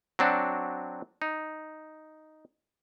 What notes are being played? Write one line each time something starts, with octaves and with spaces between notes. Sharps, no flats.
F#3 C4 D4 F#4
D#4